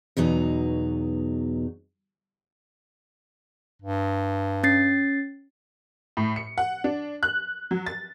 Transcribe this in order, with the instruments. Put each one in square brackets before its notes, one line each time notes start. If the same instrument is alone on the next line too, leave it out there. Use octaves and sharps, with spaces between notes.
[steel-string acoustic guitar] E2 B2 F#3 D#4
[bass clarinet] G2
[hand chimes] C#4 A6 C7
[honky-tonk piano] A2
C#7
F#5
D4
F#6
F#3
A6